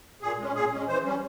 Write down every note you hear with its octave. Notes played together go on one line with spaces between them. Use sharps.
A#2 G#4
G#3 C#4
A#2 G#4
G#3 C#4
E3 C5
G3 C#4